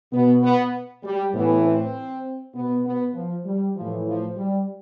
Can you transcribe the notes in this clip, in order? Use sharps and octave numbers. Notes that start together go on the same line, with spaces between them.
B2 B3
B3
G3
A2 E3 B3
C4
B2 B3
B3
F3
G3
A2 E3 F3
F3
G3